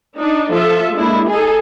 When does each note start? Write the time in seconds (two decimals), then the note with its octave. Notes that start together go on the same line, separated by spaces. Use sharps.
0.19 D4 D#4
0.52 F3 F4 A4 E5
0.93 G#3 A#3 D4 E4
1.29 D#4 G#4 A4